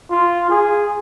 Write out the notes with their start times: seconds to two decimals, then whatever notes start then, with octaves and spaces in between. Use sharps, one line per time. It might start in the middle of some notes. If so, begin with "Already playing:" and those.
0.11 F4
0.50 G#4